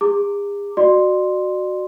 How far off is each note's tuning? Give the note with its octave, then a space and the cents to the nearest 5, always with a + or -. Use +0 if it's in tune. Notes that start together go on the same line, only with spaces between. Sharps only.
G#4 -45 A#5 -30 D6 +0
F#4 +0 D5 +40 C6 +0